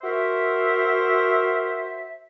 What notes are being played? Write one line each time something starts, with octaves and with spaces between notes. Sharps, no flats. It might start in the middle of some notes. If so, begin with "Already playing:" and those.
F#4 A#4 C5 E5